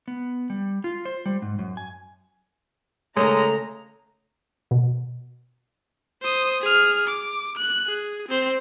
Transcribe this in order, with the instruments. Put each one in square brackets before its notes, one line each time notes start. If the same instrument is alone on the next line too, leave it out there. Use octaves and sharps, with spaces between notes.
[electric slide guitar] B3
G3
F4
C5
G3
G#2
F#2
G#5
[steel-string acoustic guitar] C#3 A3 [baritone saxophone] G#3 [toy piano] A#4 C#5 [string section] A#5
[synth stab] B2
[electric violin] C5 D#6
G#4 F6
D6
F#6
G#4
C4 C5